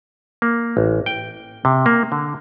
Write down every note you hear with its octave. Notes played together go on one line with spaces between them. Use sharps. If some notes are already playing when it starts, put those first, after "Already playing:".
A#3
A1
G5
C3
A#3
D3